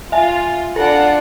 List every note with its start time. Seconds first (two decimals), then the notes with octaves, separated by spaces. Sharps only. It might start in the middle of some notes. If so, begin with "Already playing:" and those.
0.12 F4 E5 G#5
0.76 D4 F4 A4 F#5